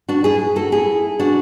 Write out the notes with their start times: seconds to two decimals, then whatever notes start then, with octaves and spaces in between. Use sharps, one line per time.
0.09 D4 F#4
0.24 E4 G#4
0.56 F#4 A4
0.72 E4 G#4
1.19 D4 F#4